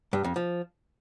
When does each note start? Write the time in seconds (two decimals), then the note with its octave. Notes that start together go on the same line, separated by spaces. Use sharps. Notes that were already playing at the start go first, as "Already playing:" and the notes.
0.13 G2
0.24 F2
0.36 F3